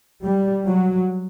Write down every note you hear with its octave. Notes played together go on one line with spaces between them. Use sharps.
G3
F#3